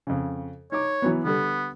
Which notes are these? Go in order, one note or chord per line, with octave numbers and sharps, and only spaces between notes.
F2 C#3
D#4 C#5 D6
E3 F#3 B3
D3 G3 B3 A4